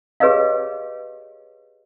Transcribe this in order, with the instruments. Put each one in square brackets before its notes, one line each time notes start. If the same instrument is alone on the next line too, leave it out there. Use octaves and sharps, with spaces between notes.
[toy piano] G4 G#4 B4 C#5 D#5 F5